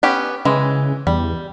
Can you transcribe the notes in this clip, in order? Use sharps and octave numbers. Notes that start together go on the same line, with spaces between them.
B3 C#4 G4
C#3 E3 G#3
E2 G3